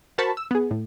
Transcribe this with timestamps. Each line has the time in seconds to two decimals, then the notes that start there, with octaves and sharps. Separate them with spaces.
0.18 F#4 A#4 C5 A5 B5 C#6
0.37 E6
0.51 B3 G#4
0.71 A2